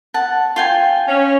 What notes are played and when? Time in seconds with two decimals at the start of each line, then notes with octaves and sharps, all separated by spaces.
0.14 F#5 A5
0.56 F4 G5 G#5
1.08 C#4